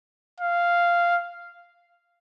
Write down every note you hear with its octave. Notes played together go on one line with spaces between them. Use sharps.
F5